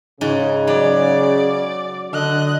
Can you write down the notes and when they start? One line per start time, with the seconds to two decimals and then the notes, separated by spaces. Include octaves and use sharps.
0.21 G#2 C#3 D#4 F#4
0.67 F#3 D5
2.13 D3 D#5 F#6